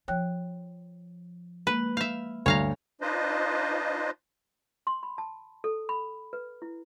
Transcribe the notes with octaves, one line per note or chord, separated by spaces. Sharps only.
F3 C#5 G5 F#6
G#3 A#3 B4
E5 F5 G6
D2 G2 G3 C#5 F5 A#5
D4 D#4 F4 B4 C5 D#5
C6
B5
A5
A4
B5
B4
E4